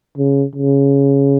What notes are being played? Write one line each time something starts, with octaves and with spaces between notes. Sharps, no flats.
C#3
C#3